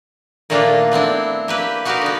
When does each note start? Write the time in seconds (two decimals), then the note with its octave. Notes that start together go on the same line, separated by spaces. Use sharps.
0.50 A#2 D#3 A3 A#3 D4 F4
0.92 B3 C4 D4 E4
1.48 A#3 G4 B4
1.85 D#4 F#4 G4 A#4 B4 F5
2.02 D3 B3